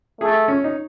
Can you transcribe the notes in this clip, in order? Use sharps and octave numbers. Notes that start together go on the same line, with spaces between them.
A3 G#4
C#4
D#4